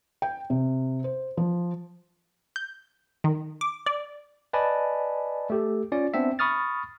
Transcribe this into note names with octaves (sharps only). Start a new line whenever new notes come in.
G5
C3
C5
F3
G6
D#3
D6
D5
B4 D5 D#5 G#5 A5 B5
A3 G4 A4
C#4 F4 D5
B3 C4 D4 E5
B5 C#6 D#6 F6 A6